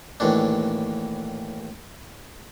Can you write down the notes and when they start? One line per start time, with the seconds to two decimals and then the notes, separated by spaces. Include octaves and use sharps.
0.20 D#2 A2 E3 D4